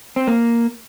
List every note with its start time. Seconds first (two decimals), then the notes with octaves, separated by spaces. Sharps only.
0.16 C4
0.27 A#3